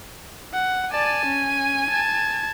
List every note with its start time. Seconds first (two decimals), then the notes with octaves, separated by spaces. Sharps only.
0.53 F#5
0.92 D5 G#5 A5
1.25 C#4
1.89 A5 G#6